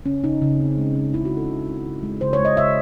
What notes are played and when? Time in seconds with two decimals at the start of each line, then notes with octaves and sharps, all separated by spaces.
0.06 C#3 C#4
0.24 C#3 D#4
0.42 C#3
0.60 C4
0.78 G#3
0.95 C4
1.13 C#3 E4
1.25 F#4
1.32 C4
1.37 A4
1.50 C#3
1.67 C4
1.86 C#3
2.03 G#3
2.21 C#3 C5
2.33 C#5
2.39 G#3
2.45 D#5
2.57 C#3 E5